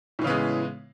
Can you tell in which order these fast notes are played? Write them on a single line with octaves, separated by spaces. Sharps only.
A2 E3 C#3 B3 G#3